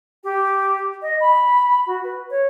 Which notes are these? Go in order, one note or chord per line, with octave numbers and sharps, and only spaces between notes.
G4
D#5
B5
F#4
B4
C#5